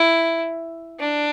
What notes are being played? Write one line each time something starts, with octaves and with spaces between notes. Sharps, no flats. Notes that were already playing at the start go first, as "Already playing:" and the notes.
Already playing: E4
D4